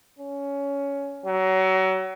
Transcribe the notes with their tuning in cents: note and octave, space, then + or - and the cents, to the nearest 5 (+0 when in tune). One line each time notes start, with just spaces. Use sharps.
C#4 +15
F#3 +30